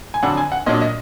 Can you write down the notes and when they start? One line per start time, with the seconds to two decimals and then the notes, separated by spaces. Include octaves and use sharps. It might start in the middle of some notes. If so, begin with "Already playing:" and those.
0.14 G#5
0.23 F2 D3 F#3 D4 F#5
0.37 G#5
0.52 F#5
0.66 A#2 F#3 D4 D#5
0.81 D#5